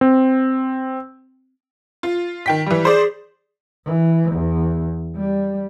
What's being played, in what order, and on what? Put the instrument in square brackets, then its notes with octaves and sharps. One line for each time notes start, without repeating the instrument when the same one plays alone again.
[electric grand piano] C4
[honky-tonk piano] F4
D#3 G5 B6
E3 G3
[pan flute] G#4 [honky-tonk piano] C5 D5
[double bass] E3
E2
G3